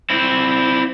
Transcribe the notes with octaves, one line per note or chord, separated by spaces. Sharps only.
C4 E4